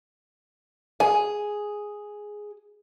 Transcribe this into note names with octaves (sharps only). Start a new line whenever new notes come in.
G#4 G#5